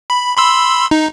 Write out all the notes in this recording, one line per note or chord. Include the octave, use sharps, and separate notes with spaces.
B5
B5 C6 E6
D#4